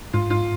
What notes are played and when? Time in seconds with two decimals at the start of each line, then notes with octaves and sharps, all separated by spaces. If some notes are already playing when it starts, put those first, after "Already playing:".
0.13 G#2 F4
0.30 F4